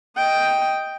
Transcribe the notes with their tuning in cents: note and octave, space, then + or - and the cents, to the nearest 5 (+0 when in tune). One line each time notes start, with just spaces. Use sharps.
D#5 +10 G5 +0